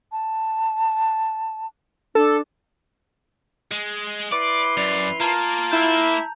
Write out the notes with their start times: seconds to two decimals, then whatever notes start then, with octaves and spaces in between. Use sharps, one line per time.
0.12 A5
2.15 D4 A4
3.72 G#3
4.32 E4 B4 D5 C6 D6
4.77 F#2 D5 F7
5.20 A#3 F4 A5 A#5
5.71 E4 G6